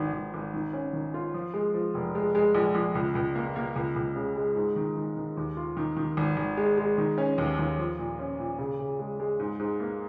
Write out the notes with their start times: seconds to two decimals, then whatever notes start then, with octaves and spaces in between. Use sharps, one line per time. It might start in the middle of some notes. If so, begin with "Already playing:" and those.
Already playing: G#1 D#3
0.13 G#1
0.34 G#1
0.54 D#3
0.73 C#4
0.93 D#3
1.14 F4
1.34 F3
1.54 G#3
1.74 F3
1.94 F1
2.15 G#3
2.35 G#3
2.55 A#1
2.75 A#1
2.95 C#2
3.15 C#2
3.35 A#3
3.56 A#3
3.76 C#2
3.96 C#2
4.16 C#3
4.36 G#3
4.56 G#2
4.76 D#3
4.96 D#3
5.17 D#3
5.37 D#2
5.57 F4
5.77 D#3
5.96 D#3
6.17 G#1
6.37 G#1
6.57 G#3
6.77 G#3
6.98 D#3
7.18 C#4
7.38 D#2
7.59 D#2
7.78 F3
7.98 A#2
8.19 C#4
8.39 A#2
8.59 C#3
8.79 C#3
8.99 G#3
9.20 G#3
9.39 G#2
9.59 G#2
9.80 A#3